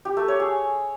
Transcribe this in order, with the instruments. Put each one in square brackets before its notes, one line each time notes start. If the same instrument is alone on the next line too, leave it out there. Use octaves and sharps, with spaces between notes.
[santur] G4
A3
C#5
G#4